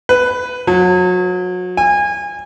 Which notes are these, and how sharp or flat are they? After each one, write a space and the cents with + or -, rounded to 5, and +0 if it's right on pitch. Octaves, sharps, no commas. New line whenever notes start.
B4 +10
F#3 -30
G#5 -25